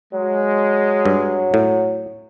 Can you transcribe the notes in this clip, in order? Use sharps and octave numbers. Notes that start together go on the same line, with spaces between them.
F#3 G#3
G2
A2